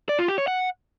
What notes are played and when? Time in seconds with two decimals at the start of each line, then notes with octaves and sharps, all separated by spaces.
0.09 D5
0.19 F4
0.28 G4
0.38 C#5
0.48 F#5